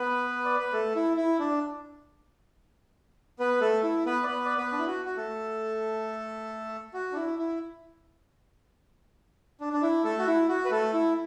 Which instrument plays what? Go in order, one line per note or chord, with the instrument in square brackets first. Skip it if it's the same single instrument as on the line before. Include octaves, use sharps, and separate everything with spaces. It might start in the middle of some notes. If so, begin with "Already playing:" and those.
Already playing: [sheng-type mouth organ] B3 B4
D5
B4
A3 A4
E4
E4
D4
B3 B4
A3 A4
E4
B3 B4
D5
B3 B4
D5
B3 B4
D4
E4
F#4
F#4
A3 A4
F#4
D4
E4
E4
D4
D4
E4
A3 A4
F#4
E4
F#4
B4
A3 A4
E4